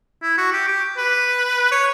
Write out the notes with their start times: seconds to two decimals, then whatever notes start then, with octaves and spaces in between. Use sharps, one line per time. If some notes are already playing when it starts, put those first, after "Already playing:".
0.22 E4
0.38 F#4
0.53 G4
0.68 G4
0.97 B4
1.72 C#5